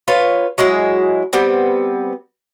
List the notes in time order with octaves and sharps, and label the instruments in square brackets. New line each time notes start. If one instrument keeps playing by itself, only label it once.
[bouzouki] F4 B4 C#5
F#3 G#3 E4 G#4
G3 B3 C4